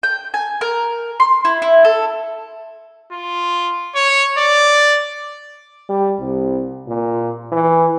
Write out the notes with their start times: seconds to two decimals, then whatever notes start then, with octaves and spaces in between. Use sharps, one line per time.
0.03 G5
0.34 G#5
0.61 A#4
1.20 C6
1.45 E4
1.62 E4
1.85 A4
3.12 F4
3.95 C#5
4.38 D5
5.89 G3
6.19 C2
6.87 A#2
7.52 E3